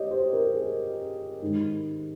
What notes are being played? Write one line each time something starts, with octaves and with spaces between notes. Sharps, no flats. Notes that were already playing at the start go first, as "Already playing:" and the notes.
Already playing: G4 C#5 D#5
C5
A#4
G#4
G#2 D#3